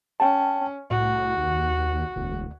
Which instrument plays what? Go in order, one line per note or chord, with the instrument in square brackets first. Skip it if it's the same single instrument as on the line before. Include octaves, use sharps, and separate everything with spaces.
[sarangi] C#4 [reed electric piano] G5 A5
[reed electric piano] C2 [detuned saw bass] A2 [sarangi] F#4
[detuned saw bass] D#2
[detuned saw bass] E1 [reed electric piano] D2